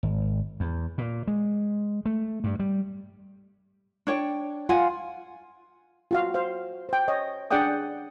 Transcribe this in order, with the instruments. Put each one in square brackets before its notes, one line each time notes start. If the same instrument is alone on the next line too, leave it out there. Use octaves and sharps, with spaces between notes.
[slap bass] G#1
E2
A#2
G#3
A3
G2
G3
[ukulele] D4 C#5 G5
[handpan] F4 [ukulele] F#5 G#5
[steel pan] F4 F#4 F5
C5 F5
C5 G5
C#5 D#5
D4 G#4 D5 F#5 G5 D#6